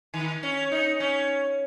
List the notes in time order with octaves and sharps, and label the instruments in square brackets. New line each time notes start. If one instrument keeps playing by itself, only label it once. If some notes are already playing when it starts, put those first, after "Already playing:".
[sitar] D#3
C#4
D#4
C#4